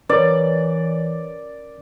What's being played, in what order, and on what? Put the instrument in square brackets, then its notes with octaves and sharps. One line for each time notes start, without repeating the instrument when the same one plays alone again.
[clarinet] E3 [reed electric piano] C#4 A#4 [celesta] B4 C#5 [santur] D5